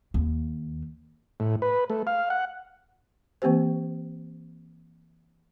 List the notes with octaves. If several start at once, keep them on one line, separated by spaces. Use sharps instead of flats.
D#2
A2
B4
A3
F5
F#5
E3 A#3 C4 G4 C5